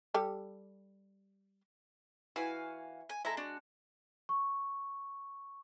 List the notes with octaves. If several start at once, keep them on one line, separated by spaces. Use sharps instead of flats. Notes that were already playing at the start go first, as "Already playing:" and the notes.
G3 G4 A4
E3 F#4 F5 G#5
G#5
G#3 E4 A4 A#5
D4 F#4
C#6